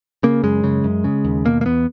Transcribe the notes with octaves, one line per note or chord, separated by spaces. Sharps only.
C#3 A#3
F#2 G#3
C#3
F#2
C#3
D#2
B2 A#3
A#3
E2 B3